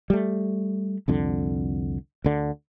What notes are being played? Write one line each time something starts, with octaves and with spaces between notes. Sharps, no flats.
G3 A3
C2 F2 D3
D2 D3